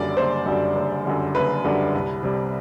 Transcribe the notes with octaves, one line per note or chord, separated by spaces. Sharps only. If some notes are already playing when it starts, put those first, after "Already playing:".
Already playing: F#1 F#2 D3 G3 D5
F#1 C5
F#2 D3 G3
F#1
F#2 D3 G3
F#1 B4
F#2 D3 G3
C2
C3 G3